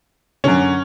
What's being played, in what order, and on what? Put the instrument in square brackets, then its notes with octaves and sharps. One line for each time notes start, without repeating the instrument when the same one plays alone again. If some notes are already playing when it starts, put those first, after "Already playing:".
[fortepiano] F#2 D3 [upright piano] C#4